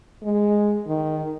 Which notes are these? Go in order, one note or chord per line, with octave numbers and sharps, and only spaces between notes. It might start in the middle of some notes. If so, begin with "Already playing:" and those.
G#3
D#3